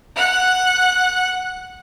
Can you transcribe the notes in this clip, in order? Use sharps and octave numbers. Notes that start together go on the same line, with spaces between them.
F#5 F#6